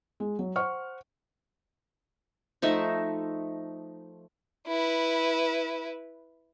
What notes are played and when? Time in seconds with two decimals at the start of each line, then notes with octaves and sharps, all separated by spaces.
0.20 G#3
0.39 F#3
0.56 C5 F#5 C#6 F6
2.62 F3 A3 D#4 E5
4.68 E4 B4